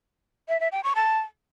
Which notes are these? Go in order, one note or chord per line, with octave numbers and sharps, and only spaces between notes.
E5
E5
G5
C#6
A5